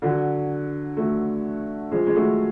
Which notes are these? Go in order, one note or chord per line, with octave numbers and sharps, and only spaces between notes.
D3 F#3
F#3 A3
F3 G#3
G#3
F#3 A3